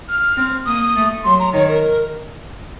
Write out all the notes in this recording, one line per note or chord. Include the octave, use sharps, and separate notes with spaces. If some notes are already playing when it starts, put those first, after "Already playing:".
F6
C4
A#3 D#6
A3
F#3 C6
A#5
D#3 C#5
A#4